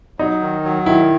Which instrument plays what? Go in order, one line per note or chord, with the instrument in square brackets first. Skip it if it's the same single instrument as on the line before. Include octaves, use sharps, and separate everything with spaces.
[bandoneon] F#3 [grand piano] D#4
[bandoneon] D#3
F#3
[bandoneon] D#3 [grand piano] E4